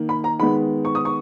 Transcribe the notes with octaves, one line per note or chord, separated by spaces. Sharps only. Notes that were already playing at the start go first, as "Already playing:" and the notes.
Already playing: D#3 A#3
B5
A#5
D#3 G#3 B3 B5
C#6
D#6
C#6